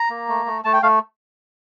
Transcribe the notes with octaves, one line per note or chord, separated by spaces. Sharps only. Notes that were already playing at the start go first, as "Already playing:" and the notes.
Already playing: A#5
A#3
A3
A3
A3 A5
G5
A3 F5